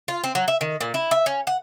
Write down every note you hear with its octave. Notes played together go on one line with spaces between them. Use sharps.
F4
C4
F#3
E5
D#3
A#2
E4
E5
C#4
F#5